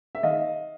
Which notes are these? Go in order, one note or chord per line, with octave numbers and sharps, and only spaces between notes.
E5
D#3 D#5 F5